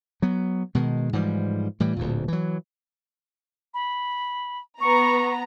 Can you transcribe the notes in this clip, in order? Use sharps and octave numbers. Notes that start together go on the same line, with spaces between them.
F#3 B3
B2 D#3 G#3
G#2 E3 F3 G3
A2 E3 G3
D1 D2 A#2
E3 F#3
B5
B3 A#5 C#6